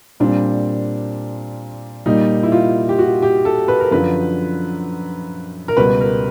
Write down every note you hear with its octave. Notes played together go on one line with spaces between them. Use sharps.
A#2 G3 C4 D4
A#2 G3 A#3 D#4
E4
F4
G4
F#4
G4
A4
B4
A#4
F#2 D3 F3 B4
A#4
C#2 B2 G3 B3 B4
A#4